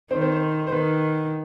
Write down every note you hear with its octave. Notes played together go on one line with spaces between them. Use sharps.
D#3 C4 C5
C4 C5
C4 C5
C5
D#3 B3 B4